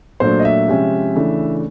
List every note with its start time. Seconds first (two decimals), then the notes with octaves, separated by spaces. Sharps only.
0.20 A#2 F#3 A3 D4 C5
0.40 D#5
0.45 E5
0.68 C3 F3 G#3 C#4
1.15 C#3 E3 A3 D4